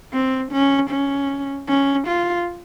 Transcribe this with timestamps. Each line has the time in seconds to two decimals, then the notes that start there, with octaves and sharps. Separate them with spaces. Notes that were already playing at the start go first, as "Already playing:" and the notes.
0.13 C4
0.52 C#4
0.91 C#4
1.68 C#4
2.08 F4